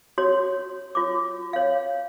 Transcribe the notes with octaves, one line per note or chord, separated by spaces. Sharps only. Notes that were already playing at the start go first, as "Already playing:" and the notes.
F#4 C#5
F4 C#5 D6
C#5 F5